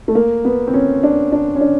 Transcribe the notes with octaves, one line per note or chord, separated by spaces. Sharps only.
A3
A#3
B3
C4
C#4
D4
D4
C#4
D4